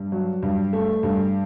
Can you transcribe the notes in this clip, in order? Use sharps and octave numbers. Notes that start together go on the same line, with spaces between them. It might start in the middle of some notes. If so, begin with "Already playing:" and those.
Already playing: G2
F#3
G2
A3
G2